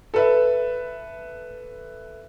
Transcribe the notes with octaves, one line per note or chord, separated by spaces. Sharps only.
A4 B4 E5